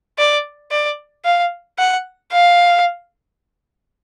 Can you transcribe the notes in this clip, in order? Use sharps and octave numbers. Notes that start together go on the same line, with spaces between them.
D5
D5
F5
F#5
F5